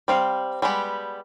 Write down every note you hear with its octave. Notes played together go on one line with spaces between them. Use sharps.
G3 C4 F5
G3 G#3 B3 G4